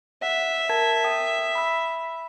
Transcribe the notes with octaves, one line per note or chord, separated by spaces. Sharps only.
E5 F#5
A#4 A5 G#6
G5 D#6
B5 E6